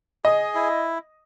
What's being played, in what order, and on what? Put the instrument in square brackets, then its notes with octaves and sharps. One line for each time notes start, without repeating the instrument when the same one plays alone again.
[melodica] G#4 [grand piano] D#5
[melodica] E4